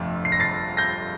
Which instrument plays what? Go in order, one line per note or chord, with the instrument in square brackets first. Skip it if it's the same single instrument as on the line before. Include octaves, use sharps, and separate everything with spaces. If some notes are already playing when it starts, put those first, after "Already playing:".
Already playing: [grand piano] G1 F2 C3 F3 A3
C7
A#6
A6 C7
G6 A#6